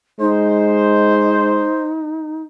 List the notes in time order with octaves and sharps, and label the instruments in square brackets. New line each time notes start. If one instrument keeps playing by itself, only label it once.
[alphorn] G#3 [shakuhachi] D#4 [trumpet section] C5